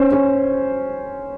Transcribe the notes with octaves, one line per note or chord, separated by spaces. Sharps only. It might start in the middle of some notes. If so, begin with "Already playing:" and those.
Already playing: C#4 C5
C#4